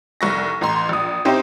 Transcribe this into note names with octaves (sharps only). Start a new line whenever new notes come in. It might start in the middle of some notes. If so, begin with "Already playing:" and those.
F1 C2 C#6 A#6
A1 A#5 C6
A#1 D#6
C4 C#4 D#4 E4 G4 C5